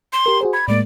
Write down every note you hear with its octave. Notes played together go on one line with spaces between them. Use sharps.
C6
G4 A#4
F#4 G#4 C5
B5 G#6
A2 G#3 A#3 D5